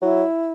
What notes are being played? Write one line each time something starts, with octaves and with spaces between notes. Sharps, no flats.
F#3 E4